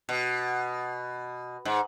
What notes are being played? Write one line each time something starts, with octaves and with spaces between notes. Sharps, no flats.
B2
G#2